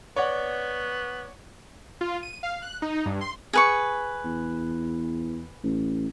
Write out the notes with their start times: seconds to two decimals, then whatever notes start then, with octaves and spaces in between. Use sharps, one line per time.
0.16 B3 C#5 D5 F#5
2.01 F4
2.23 D#7
2.43 F5
2.62 F#6
2.82 D#4
3.06 G2
3.21 C6
3.53 G#4 B4 C#6
4.24 E2
5.63 A1